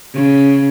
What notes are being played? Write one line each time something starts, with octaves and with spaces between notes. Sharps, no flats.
C#3